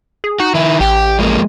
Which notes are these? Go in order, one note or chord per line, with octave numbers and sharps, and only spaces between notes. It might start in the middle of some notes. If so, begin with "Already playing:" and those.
G#4
D#4 F#4
D#3 E4
A1 G4
F3 G#3 A#3